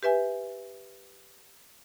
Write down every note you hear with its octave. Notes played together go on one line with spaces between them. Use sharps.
G4 B4 E5 G#5